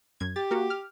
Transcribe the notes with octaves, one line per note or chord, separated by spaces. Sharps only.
F#2 G#6
G4 A6
A#3 F#4
F6